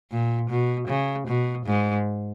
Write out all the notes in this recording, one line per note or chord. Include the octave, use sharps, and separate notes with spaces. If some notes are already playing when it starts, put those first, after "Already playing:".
A#2
B2
C#3
B2
G#2